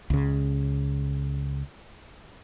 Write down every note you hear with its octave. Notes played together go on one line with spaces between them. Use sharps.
C#2 C#3